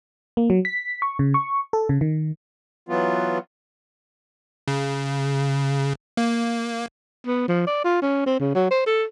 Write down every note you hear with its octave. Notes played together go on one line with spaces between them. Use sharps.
A#3
F#3
B6
C#6
C#3
C#6
A4
C#3
D#3
E3 F#3 B3 F4
C#3
A#3
B3
F3
D5
F4
C#4
C4
C#3
F#3
C5
A4